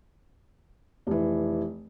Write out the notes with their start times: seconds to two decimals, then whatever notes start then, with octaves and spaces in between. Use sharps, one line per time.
1.07 F1 E3